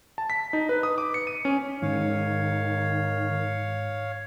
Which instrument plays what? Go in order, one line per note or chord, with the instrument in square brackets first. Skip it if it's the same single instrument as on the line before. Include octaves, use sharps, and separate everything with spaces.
[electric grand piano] A5
B6
D#4
B4
D#6
D6
C#7
D#7
C#4
[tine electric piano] G#2 [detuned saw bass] D#3 [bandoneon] C#5 F5